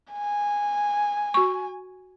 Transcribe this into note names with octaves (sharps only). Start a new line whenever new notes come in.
G#5
F#4 C#6